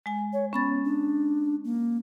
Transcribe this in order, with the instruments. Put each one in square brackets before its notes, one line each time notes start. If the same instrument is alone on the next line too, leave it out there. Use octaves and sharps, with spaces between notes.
[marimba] G#3 G#5
[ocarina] C#5
[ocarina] B3 [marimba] C#4 B5 A6
[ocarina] D4
A#3